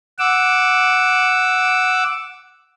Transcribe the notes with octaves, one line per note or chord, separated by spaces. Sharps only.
F#5 D6 E6